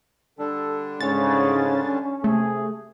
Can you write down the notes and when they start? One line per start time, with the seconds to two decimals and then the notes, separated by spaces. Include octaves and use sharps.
0.39 D3 G3 D4 A4
1.01 G#2 C#3 C#4 C#5 A6
2.24 C3 A3 G#4